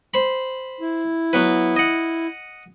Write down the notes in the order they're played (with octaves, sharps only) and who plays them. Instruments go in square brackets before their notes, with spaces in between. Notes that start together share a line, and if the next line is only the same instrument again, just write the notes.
[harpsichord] C5 B5
[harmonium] E4
[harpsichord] F#3 B3 B4
D#5 F#5